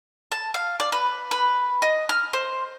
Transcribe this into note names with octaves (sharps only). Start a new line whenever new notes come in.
A5
F5
D5
B4
B4
D#5
F6
C5